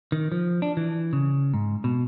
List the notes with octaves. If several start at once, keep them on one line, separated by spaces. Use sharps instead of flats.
D#3
F3
D4
E3
C#3
G#2
B2